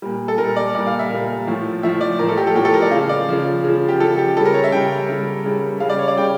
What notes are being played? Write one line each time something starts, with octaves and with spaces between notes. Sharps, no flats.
A#2 G3
A4
A#2 G3 A#4
D5
A#2 G3 D5
F5
E5
A#2 G3
A2 F3
A2 F3 E5
D5
A2 F3 A#4
A4
G4
A4
A2 F3 G4
A4
A#4
D5
C#3 F3 F5
D5
C#3 F3
C#3 F3
G4
C#3 F3 A4
G4
C#3 G3 A4
A#4
C#5
E5
C#3 G3 G5
C#3 G3
C#3 G3
C#3 G3 F5
D5
C#5
D5
C#3 G3 G5